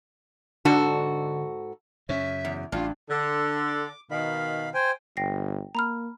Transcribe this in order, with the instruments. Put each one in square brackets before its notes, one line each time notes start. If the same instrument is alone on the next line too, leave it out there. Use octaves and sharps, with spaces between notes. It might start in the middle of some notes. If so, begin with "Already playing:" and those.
[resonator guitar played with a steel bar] G#2 F#4 A4 [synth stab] D3
[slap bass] F#2 C#3 [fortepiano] C#4 [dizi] E5
[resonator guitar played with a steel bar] E2
[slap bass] A1 [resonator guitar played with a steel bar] G2 [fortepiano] D4 [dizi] F4
[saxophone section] D3 [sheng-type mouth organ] A4
[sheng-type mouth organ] D6
[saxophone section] B2 D#3 [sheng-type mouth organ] F5 B5
[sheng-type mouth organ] C5 G5 G#5
[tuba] G1 [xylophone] G5 A#6 C7
[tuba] A#3 [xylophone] A#5 B5 F6